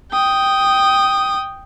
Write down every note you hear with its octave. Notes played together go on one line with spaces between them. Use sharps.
G5 D#6